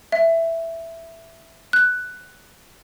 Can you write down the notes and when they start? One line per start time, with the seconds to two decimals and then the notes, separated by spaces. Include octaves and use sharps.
0.12 E5
1.73 F#6